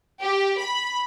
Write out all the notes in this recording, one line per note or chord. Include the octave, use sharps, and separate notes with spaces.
G4
B5